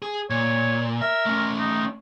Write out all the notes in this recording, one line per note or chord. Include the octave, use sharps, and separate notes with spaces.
G#4
A#2 C#5
A#4 E5
A3 C#4
D#4